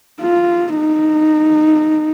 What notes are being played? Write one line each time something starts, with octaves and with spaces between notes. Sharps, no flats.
F4
D#4